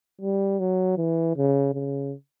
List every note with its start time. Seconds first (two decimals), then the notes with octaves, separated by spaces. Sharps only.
0.21 G3
0.60 F#3
0.97 E3
1.36 C#3
1.74 C#3